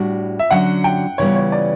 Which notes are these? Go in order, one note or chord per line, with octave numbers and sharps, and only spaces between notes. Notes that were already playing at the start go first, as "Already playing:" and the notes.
Already playing: A2 G3 D4 F#4
E5
D3 F#3 C#4 F#5
G5
C#3 E3 G3 B3 C#5
C#5
D5